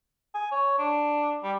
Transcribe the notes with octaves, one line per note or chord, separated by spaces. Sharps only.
G#5
C#5
D4
G3